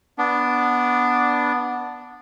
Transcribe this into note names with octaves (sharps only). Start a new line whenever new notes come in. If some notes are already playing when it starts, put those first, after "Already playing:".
B3 D4